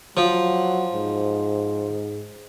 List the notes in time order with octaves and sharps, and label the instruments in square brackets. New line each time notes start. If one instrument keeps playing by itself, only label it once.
[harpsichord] F3 [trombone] F#3
[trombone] G#2